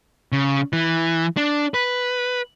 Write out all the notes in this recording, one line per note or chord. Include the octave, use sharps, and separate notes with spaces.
C#3
E3
D4
B4